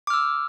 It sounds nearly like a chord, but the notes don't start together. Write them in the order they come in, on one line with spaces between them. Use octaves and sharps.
D6 F6 E6